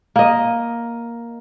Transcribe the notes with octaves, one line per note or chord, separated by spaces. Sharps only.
A#3 D#5